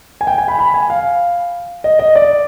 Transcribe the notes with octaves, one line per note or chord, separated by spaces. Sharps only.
G#5
G5
G#5
B5
B5
G#5
F5
D#5
D#5
D5